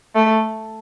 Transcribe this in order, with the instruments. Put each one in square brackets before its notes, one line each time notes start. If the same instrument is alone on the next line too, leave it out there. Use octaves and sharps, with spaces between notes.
[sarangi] A3